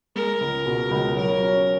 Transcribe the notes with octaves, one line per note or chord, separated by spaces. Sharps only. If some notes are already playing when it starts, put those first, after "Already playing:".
G#3 A#4
C#2
B2
C#2
F#3 A#4
C#4